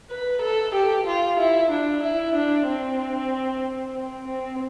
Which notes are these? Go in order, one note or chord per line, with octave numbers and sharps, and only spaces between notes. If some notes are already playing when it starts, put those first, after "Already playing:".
B4
A4
G4
F4
E4
D4
E4
D4
C4
C4
C4